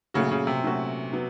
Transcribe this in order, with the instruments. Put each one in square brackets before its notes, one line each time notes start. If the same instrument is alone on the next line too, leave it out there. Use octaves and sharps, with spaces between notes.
[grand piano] A#2 F#3 A3 C#4 F#4 [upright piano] C#3
[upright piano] C#3
C3
[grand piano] A#2 F#3 A3 C#4 F#4
F#3 B3